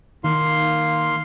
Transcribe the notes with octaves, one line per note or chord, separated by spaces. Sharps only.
D#3 A#3 F5 C6